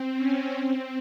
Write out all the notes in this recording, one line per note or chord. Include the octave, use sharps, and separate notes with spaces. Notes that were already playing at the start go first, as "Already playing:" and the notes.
Already playing: C4
C#4
C4